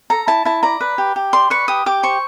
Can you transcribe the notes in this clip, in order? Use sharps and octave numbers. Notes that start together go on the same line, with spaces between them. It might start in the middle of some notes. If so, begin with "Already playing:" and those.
A4 A#5
E4 A5
E4 A5
D5 A#5
B4
G4
G4
D5 C6
B4 C#6
G4 D#6
G4 D6
C5 C#6